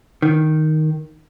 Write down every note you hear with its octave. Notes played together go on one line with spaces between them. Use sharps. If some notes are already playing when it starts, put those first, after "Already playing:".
D#3